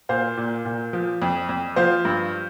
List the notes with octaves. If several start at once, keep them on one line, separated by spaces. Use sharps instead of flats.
A#2 C5 F5
A#2
A#2
F3
F2
F2
F3 C5 F5
G2